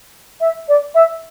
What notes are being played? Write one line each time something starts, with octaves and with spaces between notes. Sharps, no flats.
E5
D5
E5